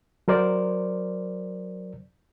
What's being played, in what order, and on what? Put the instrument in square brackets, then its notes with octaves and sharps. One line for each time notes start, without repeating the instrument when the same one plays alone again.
[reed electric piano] F#3 A#4 C5 D5